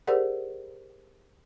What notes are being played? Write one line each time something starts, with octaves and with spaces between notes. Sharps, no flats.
G4 G#4 A#4 C5 D5 F#5